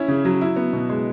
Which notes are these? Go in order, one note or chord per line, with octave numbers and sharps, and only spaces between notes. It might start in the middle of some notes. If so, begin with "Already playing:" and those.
Already playing: C#4 E4
C#3
F#3
E4
B3
B2
G#3